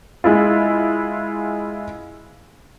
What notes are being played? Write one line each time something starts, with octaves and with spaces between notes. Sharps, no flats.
G#3 E4 F4